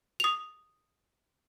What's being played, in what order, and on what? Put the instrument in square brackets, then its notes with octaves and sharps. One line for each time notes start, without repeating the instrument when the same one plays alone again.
[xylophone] D#6 F7